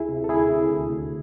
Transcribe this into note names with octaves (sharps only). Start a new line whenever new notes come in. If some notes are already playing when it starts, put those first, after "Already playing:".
Already playing: D2 E4 G#4
C3
A4
D2 E4 G#4
C3
D2
D2